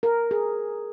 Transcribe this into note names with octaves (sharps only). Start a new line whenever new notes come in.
A#4
G#4